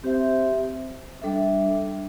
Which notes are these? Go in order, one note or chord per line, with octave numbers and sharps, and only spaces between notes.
C4 G4 C5 E5
G3 D4 A4 E5